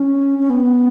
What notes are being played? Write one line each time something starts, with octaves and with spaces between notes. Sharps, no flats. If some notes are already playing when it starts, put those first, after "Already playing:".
Already playing: C#4
C#4
B3